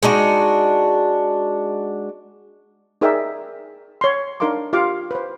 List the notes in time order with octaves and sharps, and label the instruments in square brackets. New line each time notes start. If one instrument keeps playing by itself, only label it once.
[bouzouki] G#3 D4 D#4 F#4
[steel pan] D#4 G#4 A#4 D5 E5 G5
C#5 C6
D4 D#4 A#4 F5 C6 D6
F4 G4 F5 D6
B4 C5